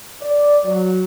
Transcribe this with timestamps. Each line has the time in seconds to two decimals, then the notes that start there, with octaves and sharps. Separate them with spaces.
0.21 D5
0.64 F#3